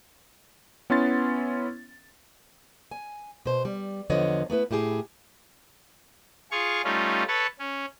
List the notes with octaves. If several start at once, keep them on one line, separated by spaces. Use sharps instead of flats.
B3 C#4 E4 C6 A6
G#5
B2 C5
G3
E2 D3 F3 B3 C#5 D#5
A3 B3 E4 B4
A2 E4 G4 G#4
F4 G#4 F5 C#6
G3 A3 C#4 D#4 F4
A4 B4 C#5 A5
C#4